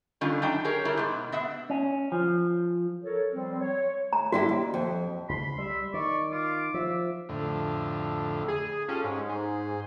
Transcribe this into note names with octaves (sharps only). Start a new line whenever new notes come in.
D3 D#3 G3 C#4 F4
F#2 D4 D#4 G5 A5
G4 G#4 A#4 C#5
D3 G3 E4 A#4
G#2 B2
B3 E5 F#5
C#4
F3
A4 A#4 C#5
F3 G3 C4
C#5
A#5
G2 E4 F#4 G4
D#2
F2
C#2 B5 C6
G3 E5
D#3 D5 C#6
F4 D6
F3 E5
F2 A2 D3
G#4
C#4 F4 G4 A4
G#2 G#3 C#4
G#4 C5